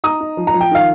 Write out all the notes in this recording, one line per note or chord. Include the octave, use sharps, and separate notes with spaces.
D#4 A#5 D#6
D#4
F3
A#5
F3
G5
D#3 F5